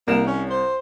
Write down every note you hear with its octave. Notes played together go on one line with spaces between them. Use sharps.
C2 A#3 E7
C#4
C5